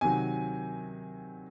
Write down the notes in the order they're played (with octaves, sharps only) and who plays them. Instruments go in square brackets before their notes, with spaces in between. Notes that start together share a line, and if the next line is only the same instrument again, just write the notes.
[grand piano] C3 D#3 F#3 G#5